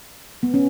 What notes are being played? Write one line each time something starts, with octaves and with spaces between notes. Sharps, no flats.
B3
C#4